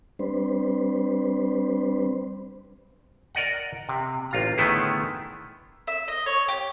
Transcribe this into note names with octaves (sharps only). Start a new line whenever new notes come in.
G3 C4 D4 B4 C5
A#4 D5 D#5 F#5
C3
A1 F4 A#5
D3 D#3 A3 B3 E4 G#4
E5
D#5
C#5
G4